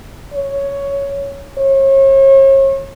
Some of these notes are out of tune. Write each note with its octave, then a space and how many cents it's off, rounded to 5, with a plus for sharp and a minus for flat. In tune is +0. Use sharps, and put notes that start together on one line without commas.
C#5 +5
C#5 -40